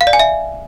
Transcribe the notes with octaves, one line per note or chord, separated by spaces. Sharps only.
F5
D5
G#5
E5